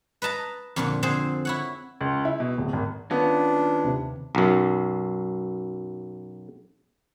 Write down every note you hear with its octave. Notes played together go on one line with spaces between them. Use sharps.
B4 D#5 A5 A#5
F2 A#2 D3
D3 C4 G#4 C5
E4 C#5 F#5
C#2
E4
B2
D1
G#1
D#3 B3 C#4 D4 F4
D#2 C3
B1 F#2